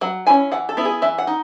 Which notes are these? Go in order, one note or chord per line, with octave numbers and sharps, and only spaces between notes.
F#3 F#5
C#4 E4 G#5
E3 F#5
A4
B3 E4
G#4
E3 E5
F#5
D#4